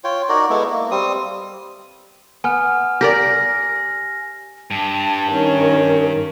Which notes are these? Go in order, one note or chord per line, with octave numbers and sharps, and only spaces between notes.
F4 C#5 G5
D#4 F#4 A#4 D5
G#3 B3 E4 A4
A#3
G3 C4 D#6
B3 G#5 F6
G4 A#4 D5 A#6
G2 A5
D#3 C#4